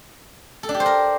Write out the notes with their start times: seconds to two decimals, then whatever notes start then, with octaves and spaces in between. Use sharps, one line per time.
0.63 A4
0.69 D4
0.74 G4
0.80 C5
0.86 A#4